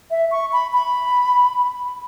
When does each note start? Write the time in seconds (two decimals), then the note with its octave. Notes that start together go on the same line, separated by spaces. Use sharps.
0.11 E5
0.31 C#6
0.52 B5
0.73 B5